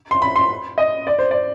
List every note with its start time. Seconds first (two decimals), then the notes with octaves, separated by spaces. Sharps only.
0.11 C6
0.22 B5
0.36 C6
0.78 D#5
1.07 D5
1.18 C5
1.31 D5